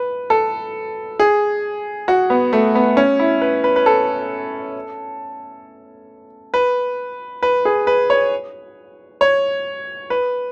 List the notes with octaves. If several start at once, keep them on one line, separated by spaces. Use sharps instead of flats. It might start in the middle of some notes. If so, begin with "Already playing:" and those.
Already playing: B4
A4
G#4
F#4
B3
A3
B3
C#4
E4
B4
B4
B4
A4
B4
B4
G#4
B4
C#5
C#5
B4